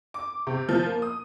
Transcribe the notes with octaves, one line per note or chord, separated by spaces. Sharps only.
D6
C3
F3
A#3
D#6